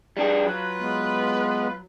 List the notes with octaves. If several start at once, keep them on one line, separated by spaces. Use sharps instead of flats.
G3 D4 G#4
F#3 F4 B4
G#3 B3